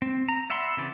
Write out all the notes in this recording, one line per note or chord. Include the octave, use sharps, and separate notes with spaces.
C4
A#5
D5 E5 F#5 B5 C6
C#3 E3 C4 D5